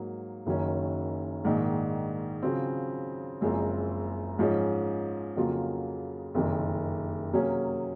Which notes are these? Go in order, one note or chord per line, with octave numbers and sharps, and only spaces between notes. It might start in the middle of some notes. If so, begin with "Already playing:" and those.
Already playing: G#2 F#3 A#3
F#1 F#2 D#3 F#3 C#4
A#1 G#2 D#3
C#3 F#3 C4 F4
F#1 F#2 F3 G#3 C4
G#2 F3 G#3 C#4
F2 C#3 F#3 A#3 F4
F#1 F2 C3 D#3
C3 F#3 A#3 C#4 G#4